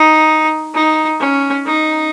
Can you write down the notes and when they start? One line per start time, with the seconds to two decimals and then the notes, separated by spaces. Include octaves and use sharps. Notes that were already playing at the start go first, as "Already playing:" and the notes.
Already playing: D#4
0.74 D#4
1.20 C#4
1.66 D#4